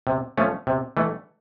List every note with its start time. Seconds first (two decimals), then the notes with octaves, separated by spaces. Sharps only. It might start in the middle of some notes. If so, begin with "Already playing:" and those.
0.07 C3
0.37 F3 A3 C#4
0.67 C3
0.97 E3 A3